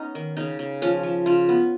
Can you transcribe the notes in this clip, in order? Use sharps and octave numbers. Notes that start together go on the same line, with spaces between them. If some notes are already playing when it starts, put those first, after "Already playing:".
Already playing: B3 C#4 D#4
D#3
C#3 D#4
C#3
F3 C#4
F3
C#3 F4
B3